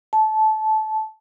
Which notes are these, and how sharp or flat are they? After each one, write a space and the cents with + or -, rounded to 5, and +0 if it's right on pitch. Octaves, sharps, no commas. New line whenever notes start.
A5 -20